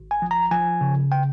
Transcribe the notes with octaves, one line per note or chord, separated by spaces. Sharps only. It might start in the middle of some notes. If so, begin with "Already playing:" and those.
Already playing: G#1
G#5
F3
A#5
F3 G#5
C#3
G5